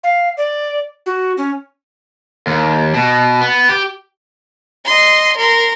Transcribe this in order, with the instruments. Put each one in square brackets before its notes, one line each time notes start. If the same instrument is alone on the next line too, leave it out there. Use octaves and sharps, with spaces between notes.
[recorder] F5
D5
F#4
C#4
[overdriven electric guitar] D#2
B2
B3
G4
[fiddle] D#5 C6
A#4 C6